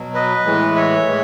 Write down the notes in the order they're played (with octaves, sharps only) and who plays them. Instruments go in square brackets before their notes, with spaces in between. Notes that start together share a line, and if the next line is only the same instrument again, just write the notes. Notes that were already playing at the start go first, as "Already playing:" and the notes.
Already playing: [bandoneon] B2 F#3
B4 D#5
A2 E3 G#3
C#5 E5
A2 E3 G#3